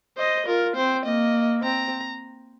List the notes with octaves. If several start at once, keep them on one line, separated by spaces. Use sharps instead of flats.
C5 D#5
F4 A#4
C4 C5
A#3 D#5
C4 A#5